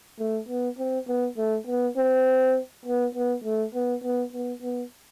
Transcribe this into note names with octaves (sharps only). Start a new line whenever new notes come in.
A3
B3
C4
B3
A3
B3
C4
B3
B3
A3
B3
B3
B3
B3